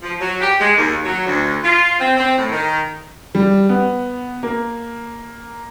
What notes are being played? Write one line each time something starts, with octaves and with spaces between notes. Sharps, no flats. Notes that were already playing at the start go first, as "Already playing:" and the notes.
F3
F#3
G4
G#3
D#2
F#3
D2
F4
C4
C4
A2
D#3
G3
B3
A#3